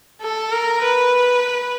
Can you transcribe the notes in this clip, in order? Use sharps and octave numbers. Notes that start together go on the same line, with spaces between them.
A4
A#4
B4